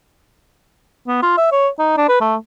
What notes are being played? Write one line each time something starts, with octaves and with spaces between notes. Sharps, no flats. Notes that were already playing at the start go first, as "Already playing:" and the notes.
B3
F4
E5
C#5
D#4
D4
B4
A3